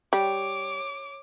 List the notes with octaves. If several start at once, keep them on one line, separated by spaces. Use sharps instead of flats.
G3 C#5 D6